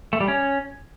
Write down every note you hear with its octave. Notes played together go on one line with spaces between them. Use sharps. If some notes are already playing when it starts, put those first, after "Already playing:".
A3
G3
C#4